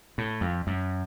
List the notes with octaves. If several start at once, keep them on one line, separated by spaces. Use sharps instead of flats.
A2
F2
F#2